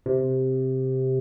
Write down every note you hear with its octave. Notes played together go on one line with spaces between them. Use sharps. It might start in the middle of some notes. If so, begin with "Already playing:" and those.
C3